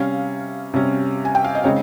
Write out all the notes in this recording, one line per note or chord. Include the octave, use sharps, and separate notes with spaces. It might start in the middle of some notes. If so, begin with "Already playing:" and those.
Already playing: C3 G3 C#4 F5
C3 G3 C#4
G#5
G5
F5
D#5
C#3 G#3 C4 D#4 C#5